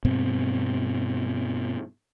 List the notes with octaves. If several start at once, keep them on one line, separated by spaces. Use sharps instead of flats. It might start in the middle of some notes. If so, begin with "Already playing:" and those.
G2 B2 C4